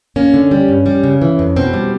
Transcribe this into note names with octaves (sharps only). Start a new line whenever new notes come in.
A#3 C#4
D3
G3
G2
G3
C#3
E3
F2
B2 C4
G3